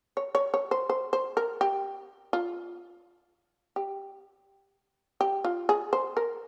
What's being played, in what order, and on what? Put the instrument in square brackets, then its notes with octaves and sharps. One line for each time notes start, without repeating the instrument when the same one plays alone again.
[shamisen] C#5
C#5
C#5
C5
C5
C5
A#4
G4
F4
G4
G4
F4
G#4
C5
A#4